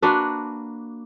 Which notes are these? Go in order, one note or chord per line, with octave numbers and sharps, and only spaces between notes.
A#3 D4 F#4 B4